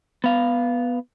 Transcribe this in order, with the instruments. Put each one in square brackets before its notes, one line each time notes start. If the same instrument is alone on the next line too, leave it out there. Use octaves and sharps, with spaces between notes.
[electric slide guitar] B3 F5